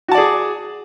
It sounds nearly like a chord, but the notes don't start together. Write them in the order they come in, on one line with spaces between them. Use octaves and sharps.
F#4 A5 D5 G#4